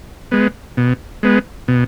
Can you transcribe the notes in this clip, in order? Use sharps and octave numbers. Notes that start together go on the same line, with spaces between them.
G#3 B3
B2
G#3 B3
B2